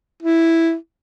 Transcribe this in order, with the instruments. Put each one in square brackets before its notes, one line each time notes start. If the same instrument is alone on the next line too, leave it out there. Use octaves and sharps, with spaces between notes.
[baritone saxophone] E4